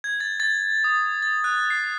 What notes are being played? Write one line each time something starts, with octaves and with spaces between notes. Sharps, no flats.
G#6
A6
A6
D#6
A6
F#6
C7